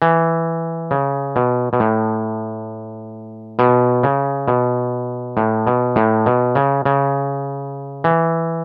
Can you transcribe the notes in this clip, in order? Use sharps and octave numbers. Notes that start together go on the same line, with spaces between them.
E3
C#3
B2
B2
A2
B2
C#3
B2
A2
B2
A2
B2
C#3
C#3
E3